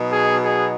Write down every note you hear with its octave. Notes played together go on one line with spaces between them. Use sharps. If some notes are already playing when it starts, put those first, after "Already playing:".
Already playing: B2 F#3 B3 D#4
G#4
G#4